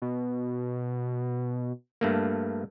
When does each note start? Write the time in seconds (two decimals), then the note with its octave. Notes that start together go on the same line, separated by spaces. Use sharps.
0.02 B2
2.01 G2 A3 A#3